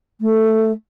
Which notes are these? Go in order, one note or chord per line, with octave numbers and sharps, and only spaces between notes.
A3